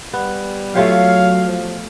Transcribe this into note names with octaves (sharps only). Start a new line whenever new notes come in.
G3 B3
F#3 A3 F4 G4 C#5 F5
F3